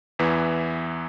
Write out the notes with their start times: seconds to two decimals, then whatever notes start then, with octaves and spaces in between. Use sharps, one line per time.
0.19 E2 E3 B3 E4